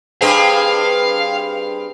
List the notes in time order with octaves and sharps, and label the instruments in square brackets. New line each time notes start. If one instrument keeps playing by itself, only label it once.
[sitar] G2 C4 G#4 [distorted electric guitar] F5